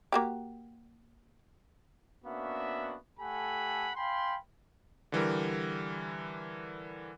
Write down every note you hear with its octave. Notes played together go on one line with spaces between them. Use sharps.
A#3 F#4 G4
A#3 B3 C#4 D4 F#4 E5
A3 G4 A4 F#5 G#5 B5
F5 G5 G#5 B5 C6
D3 E3 G3 A#4